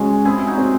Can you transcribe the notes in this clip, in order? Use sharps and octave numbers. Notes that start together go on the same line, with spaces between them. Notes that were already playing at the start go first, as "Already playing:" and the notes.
Already playing: C#3 G#3 C#4 F#4
C4 E4 G#4
D#4 F#4
C4